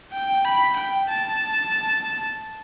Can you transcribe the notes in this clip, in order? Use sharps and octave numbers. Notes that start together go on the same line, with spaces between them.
G5
B5
G5
A5